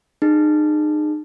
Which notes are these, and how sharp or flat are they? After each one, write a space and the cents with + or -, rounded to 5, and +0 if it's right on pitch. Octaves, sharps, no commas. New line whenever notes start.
D#4 -40 G#4 +0